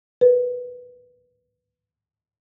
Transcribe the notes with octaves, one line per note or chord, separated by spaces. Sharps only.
A#4 B4